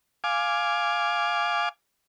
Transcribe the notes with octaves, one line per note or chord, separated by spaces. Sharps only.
F5 G#5 D6